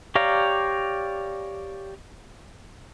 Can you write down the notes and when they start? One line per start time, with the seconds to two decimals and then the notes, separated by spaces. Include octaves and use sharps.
0.15 G4 C#5 D5 F5 A#5